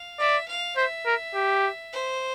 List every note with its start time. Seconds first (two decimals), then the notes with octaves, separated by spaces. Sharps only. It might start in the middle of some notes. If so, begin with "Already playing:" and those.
Already playing: F5
0.19 D5 E5
0.48 F5
0.77 C5 E5
1.06 A#4
1.35 G4
1.92 C5